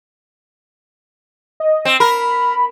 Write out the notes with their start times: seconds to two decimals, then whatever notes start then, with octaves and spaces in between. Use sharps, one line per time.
1.60 D#5
1.85 C4
2.00 A#4 B5